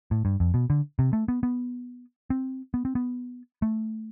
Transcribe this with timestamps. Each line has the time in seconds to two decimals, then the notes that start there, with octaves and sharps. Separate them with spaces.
0.11 A2
0.25 G2
0.40 F2
0.54 B2
0.70 D3
0.99 C3
1.13 A3
1.28 B3
1.43 B3
2.30 C4
2.74 B3
2.85 C4
2.95 B3
3.62 A3